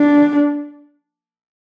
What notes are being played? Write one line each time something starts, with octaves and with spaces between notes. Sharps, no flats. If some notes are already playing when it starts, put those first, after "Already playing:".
Already playing: D4